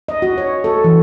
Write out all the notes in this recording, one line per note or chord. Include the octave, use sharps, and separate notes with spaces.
D#5
F#4
C#5
A4
E3